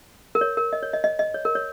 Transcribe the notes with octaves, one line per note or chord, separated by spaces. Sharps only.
A#4
C#5
A#4
D#5
C#5
D#5
D#5
D#5
C#5
A#4
C#5